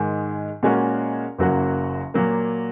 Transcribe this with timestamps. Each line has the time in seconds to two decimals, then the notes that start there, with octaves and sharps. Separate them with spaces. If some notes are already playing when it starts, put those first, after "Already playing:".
Already playing: G#2 D#3 G#3
0.63 A#2 G#3 C#4 F#4 A#4
1.38 F#1 F#2 F#3 A#3 F#4
2.14 A#2 F#3 A#3